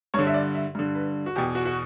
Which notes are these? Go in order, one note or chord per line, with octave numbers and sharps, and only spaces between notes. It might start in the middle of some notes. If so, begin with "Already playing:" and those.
G2 D3 C#5
E5
D5
E5
G2 D3
B4
F#4
E2 B2 G4
F#4
F#4